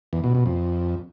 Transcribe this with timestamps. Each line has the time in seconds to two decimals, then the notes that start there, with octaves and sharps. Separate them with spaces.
0.13 E2
0.24 B2
0.35 B2
0.46 F2